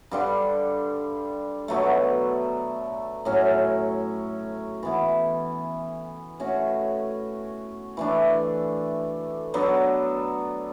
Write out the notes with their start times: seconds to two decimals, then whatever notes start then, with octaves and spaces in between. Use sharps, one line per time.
0.11 G2 D3 G3 D4
1.68 B2 F#3 A3
3.25 A2 F#3 C#4
4.83 E3 B3 E4
6.40 A3 C#4 F#4
7.97 E3 A3 D4
9.54 F#3 B3 D4 A4